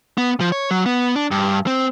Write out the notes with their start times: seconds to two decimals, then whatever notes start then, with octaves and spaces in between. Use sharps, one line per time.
0.18 B3
0.40 F3
0.52 C#5
0.71 F#3
0.86 B3
1.16 D4
1.31 G2
1.67 C4